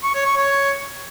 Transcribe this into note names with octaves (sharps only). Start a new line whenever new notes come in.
C#6
C#5
C#6
C#5